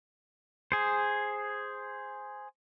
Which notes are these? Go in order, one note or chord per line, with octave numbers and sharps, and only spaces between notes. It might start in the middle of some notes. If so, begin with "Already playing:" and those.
G#4 C5